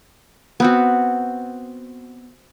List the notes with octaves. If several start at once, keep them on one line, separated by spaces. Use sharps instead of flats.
B3 C4 F#4